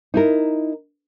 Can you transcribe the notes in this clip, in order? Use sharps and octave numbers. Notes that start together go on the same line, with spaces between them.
D#4 E4 A#4